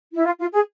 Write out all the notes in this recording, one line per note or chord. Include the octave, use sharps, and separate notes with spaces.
E4
F4
F4
G#4